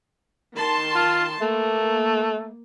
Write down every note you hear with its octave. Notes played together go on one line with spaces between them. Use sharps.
D#3 A5 C6
F4
A3 A#3